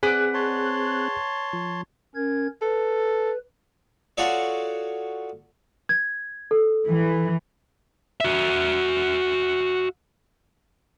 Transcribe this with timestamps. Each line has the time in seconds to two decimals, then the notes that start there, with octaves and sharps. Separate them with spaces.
0.03 C4 G#4 B4 D5 F#5 F#6
0.34 C#5 A5 C6
1.53 F3
2.15 C#4 A#4 G#6
2.62 A4 B4
4.17 F4 F#4 G#4 A4 C#5 D5
5.89 G#6
6.51 A4
6.87 E3
8.21 F#4 E5